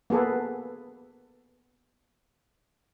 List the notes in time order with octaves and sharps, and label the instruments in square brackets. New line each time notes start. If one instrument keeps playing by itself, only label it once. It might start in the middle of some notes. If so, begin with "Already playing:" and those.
[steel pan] A#3 B3 G#4 A4 B4